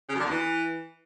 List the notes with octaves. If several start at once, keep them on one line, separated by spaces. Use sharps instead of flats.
C#3
F#2
D3
E2
E3